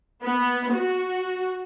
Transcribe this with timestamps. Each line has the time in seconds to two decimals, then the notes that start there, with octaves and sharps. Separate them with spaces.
0.22 B3
0.72 F#4